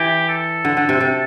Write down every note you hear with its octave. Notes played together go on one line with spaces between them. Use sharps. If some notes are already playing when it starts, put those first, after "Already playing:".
Already playing: E3 G4
A4
D3
D3
C3
C3